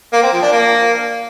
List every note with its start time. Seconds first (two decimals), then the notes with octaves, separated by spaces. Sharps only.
0.13 A#3
0.23 C4
0.32 F3
0.42 D4
0.52 A#3